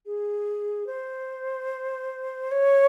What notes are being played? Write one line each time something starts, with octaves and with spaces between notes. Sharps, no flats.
G#4
C5
C#5